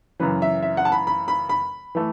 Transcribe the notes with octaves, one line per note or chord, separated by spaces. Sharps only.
F#2 C#3 E3 B4
E5
E5
F#5
A5
B5
B5
B5
B5
E3 A3